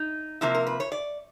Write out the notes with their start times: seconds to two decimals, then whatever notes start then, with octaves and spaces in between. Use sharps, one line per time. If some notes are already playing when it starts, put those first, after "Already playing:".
Already playing: D#4
0.41 C3 F3 A#3 E4
0.55 A#4
0.67 B4
0.80 C#5
0.92 D5